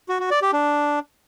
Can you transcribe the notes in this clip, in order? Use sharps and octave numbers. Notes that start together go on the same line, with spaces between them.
F#4
F#4
D5
G4
D4